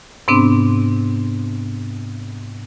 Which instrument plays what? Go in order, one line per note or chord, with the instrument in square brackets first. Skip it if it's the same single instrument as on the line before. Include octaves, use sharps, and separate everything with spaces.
[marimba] G#2 C3 B3 C4 D4